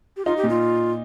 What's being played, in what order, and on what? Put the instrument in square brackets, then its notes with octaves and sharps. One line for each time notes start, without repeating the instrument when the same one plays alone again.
[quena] G4
[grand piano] D#4 [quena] F4
[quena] G4
[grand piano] A#2
[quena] F4